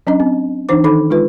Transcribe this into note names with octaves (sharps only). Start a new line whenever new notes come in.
F#3 C#4 D4 D#5
C4
E3 D4 D#4 C5 D6
D#3 D#4 A4 B5 D6
G#3 F4 B4